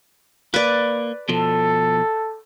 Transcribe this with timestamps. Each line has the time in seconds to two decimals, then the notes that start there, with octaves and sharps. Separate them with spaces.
0.54 A#3 B4 D5
1.29 B2 F3 A4